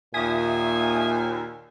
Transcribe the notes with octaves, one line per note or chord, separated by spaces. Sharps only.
D#2 A#2 E5 G#5 D#6